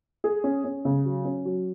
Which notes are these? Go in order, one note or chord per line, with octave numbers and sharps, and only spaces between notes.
G#4
C#4
C#4
C#3
F#3
C#4
F#3